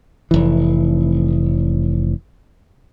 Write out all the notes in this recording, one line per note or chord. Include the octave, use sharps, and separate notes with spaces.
F1 E3